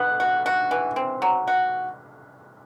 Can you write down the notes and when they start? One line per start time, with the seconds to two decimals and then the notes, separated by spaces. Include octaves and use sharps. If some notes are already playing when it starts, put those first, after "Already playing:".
Already playing: B3 F#6
0.20 F#4
0.46 F#4
0.71 E3
0.96 C4
1.22 F#3
1.48 F#4